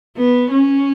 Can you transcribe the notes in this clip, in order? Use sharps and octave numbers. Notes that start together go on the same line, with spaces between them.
B3
C#4